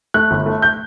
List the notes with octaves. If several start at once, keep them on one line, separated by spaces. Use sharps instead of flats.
A3 F#6
G1
A3
G6